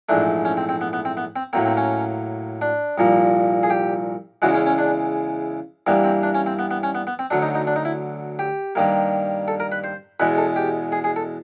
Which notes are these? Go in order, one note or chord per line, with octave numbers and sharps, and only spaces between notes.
A#1 G#2 E3 A3 D4
C#4
C4
C4
B3
B3
C4
B3
C4
A2 F#3 A#3 C4
C4
C#4
D4
C2 A#2 F3 A#3
G#4
G4
E2 C#3 E3 G#3 F#4
C#4
C#4
D4
G2 E3 G3 A#3 B3
C4
D4
C#4
C4
B3
B3
C#4
B3
B3
C4
D2 D3 F#3 D4
D#4
D#4
D4
D#4
E4
G4
G2 D#3 G3 A#3
A4
A#4
B4
C5
E2 B2 G#3 B4
A4
G4
G#4
G#4
A4